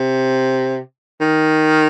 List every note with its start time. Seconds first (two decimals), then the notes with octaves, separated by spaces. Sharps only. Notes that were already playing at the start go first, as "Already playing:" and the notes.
Already playing: C3
1.21 D#3